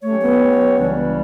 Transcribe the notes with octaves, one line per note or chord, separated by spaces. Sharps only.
F#3 A3 C#4 G4 C#5
B3
C#2 C#3 E3 G3 D4